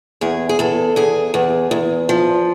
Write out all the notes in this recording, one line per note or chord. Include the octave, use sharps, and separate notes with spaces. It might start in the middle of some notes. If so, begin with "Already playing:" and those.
E2 G#4
G#4
E2 A4
E2 G#4
E2
E2
F3